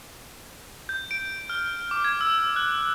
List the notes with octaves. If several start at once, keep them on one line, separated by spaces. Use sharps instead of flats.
G6
D7
F6
D6
G#6
E6
F#6